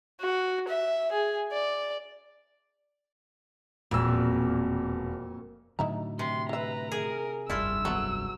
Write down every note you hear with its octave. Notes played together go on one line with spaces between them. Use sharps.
F#4
E5
G#4
D5
E1 F2 A#2 E6
A2 D3 F#3 D#4 E4 A#5
C3 C6
E4 B4 E5 A#5
G#4 A#4
F1 C2 G2 D4 E4 F4 E6
F#3 B3 A4